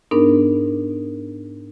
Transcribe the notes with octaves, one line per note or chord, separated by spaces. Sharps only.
G#2 B3 D4 D#4 A#4